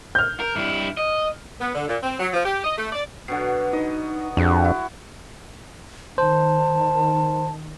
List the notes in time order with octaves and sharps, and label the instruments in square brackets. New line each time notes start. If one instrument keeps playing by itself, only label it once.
[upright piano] F6 G6
[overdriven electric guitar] A#4
G2 E4
D#5
[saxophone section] B3
D3
A#2
C4
F#3
F3
G4
D#5
A3
D5
[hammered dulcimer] B2 D3 F#3 [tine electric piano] C7
[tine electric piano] D#4 B4 [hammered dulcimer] D#5
[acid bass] F2 [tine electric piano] D4 G#4 [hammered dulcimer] F#4
[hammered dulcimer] E4
[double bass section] D#3 [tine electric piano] C5 [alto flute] A5